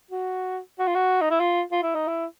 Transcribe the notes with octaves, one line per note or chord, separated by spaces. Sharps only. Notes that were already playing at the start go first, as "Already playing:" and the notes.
F#4
F#4
F4
F#4
D#4
E4
F4
F4
E4
D#4
E4